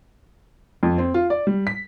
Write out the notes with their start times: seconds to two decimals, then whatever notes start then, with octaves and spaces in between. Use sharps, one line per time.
0.83 F2
0.98 C4
1.14 F4
1.30 D5
1.47 G3
1.67 B6